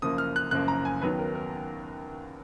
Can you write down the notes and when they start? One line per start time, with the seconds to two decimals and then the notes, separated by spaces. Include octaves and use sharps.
0.02 F#1 F#2 F3 A#3 D#6
0.18 F6
0.36 F#6
0.51 F#1 F#2 F3 A#3 F#6
0.68 A#5
0.85 G#5
1.02 D#2 D#3 F#3 B3 B4
1.19 A#4
1.35 A#4